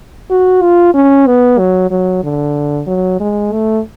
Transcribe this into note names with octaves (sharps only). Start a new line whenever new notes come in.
F#4
F4
C#4
B3
F#3
F#3
D3
F#3
G#3
A3